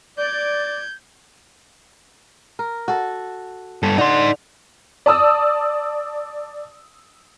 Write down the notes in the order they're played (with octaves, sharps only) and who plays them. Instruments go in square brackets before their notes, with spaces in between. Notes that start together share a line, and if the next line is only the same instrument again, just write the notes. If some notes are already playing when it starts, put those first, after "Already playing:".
[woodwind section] D5 [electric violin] G6 G#6
[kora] A#4
F#4 A4
[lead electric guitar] G2 A4
[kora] D3 [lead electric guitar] D#4 C6
[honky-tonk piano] D5 A5 D#6 E6